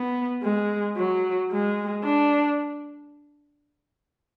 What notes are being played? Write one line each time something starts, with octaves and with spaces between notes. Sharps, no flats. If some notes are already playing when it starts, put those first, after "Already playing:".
Already playing: B3
G#3
F#3
G#3
D4